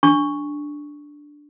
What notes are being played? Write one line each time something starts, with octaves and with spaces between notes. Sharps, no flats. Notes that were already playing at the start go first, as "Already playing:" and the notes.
D4 C#6